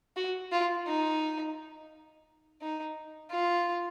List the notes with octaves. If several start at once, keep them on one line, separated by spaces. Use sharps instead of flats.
F#4
F4
D#4
D#4
F4